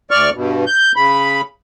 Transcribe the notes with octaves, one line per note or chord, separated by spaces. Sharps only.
D2 D5 C#6 F6
G2 B2
G6
C#3 B5